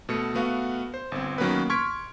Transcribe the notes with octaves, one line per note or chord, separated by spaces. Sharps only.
B2 A3 C#7
A3 B3 F#4 F5
C5
G1 C4
D#3 F#3 A#3 B3 C#4 B4
C6 C#6 F6 G#6 B6 D7